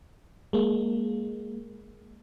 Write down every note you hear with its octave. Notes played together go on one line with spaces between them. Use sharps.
G#3 A#3